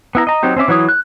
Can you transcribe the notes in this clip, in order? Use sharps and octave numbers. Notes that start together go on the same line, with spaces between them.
B3 E4 A#5
D#5 A#5
F#3 C4 D#4 G4
C4 C#4 E5 D6
E3 F#3 E4 C#5 D#6
F#6